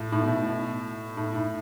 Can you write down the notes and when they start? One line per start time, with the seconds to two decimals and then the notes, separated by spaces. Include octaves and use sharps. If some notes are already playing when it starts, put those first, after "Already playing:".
Already playing: A2
0.12 A2
0.20 B2
0.27 A2
1.17 A2
1.35 A2